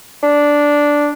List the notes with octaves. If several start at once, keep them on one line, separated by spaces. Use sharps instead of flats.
D4